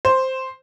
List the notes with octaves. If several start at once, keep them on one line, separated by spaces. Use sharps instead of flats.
C5